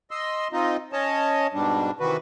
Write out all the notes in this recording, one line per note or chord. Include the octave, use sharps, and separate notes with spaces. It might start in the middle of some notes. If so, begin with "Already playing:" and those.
D#5 C6 E6
C4 D#4 F4 D#5
C#4 C#5 D#5 A5
G#2 B2 G3 D4
C3 D#3 E3 F#4 B4